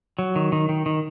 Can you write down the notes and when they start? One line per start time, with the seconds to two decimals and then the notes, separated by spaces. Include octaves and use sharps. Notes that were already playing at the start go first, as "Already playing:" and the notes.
0.19 F#3
0.36 D#3
0.52 D#3
0.69 D#3
0.86 D#3